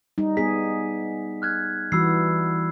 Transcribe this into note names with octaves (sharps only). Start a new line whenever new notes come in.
G3 D#4
B3 G#4 B6
F6 F#6 G#6
E3 G3 F#4 B5 E6 C7